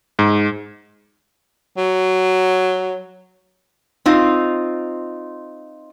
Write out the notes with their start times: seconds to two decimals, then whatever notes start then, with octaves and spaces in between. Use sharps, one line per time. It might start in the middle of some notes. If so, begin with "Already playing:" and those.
0.19 G#2
1.77 F#3
4.06 C4 D#4 F4